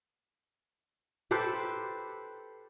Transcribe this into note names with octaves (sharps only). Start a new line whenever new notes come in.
G4 A4 B4 C5